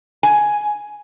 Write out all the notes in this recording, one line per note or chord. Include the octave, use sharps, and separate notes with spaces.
G#5